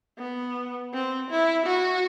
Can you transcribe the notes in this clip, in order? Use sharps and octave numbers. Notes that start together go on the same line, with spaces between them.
B3
C4
E4
F#4